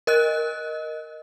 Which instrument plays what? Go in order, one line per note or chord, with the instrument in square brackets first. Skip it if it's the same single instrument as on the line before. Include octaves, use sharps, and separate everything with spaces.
[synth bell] A#4 D#5 F#6